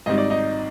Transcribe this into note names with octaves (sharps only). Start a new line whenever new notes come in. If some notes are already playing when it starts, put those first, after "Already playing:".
G#1 G#2 G3 C4 D#4 D#5
D5
D#4 D#5